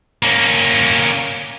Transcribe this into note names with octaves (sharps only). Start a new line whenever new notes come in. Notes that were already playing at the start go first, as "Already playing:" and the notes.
A#3 C#4